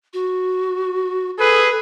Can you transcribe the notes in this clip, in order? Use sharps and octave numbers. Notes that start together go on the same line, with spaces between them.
F#4
G#4 A4 B4